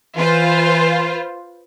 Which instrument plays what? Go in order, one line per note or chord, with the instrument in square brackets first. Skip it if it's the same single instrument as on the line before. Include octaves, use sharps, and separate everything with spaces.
[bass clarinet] E3 [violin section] F4 B4 C5